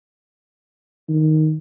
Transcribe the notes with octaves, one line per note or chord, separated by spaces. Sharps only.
D#3